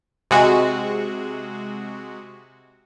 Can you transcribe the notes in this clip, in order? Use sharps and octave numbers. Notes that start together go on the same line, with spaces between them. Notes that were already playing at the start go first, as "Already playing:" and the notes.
C3 G#3 F#4